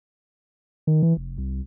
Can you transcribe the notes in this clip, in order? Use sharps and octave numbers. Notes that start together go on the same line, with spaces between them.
D#3
E3
F1
C2